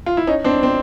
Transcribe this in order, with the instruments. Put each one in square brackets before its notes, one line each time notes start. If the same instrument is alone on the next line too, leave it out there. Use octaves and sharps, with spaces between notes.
[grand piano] F4
E4
C#4 D#4
C4 D4
C4